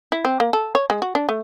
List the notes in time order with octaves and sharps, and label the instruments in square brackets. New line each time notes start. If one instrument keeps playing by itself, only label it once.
[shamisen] E4
C4
A#3
A4
C#5
G#3
F#4
D4
A3